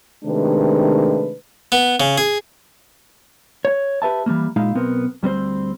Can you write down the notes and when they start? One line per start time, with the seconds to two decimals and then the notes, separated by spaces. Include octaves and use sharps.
0.25 C3 D#3 G#3 A3 D4 B4
1.72 B3
2.00 C#3
2.18 G#4
3.65 C#5
4.02 G4 B4 E5 A5
4.26 E3 G3 A3 A#3
4.56 A#2 G#3 D#4 E4 F5
4.75 B1 B3 C4 A#4
5.23 D2 G3 C4 C5